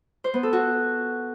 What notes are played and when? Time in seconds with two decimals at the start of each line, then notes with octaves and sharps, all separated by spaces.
0.24 C5
0.34 B3
0.43 A4
0.53 F#4